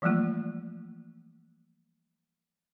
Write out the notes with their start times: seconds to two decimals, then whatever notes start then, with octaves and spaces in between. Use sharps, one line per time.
0.02 E3 F3 G3 A3 A#3 F4